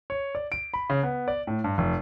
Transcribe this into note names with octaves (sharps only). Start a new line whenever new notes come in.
C#5
D5
D7
B5
C#3
B3
D5
A2
G2
F1